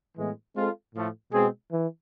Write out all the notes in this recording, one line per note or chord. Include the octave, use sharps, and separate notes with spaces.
A2 E3 G#3 B3
G#3 C4 F4 A4
A2 F3 A3
B2 G#3 C4 G#4
E3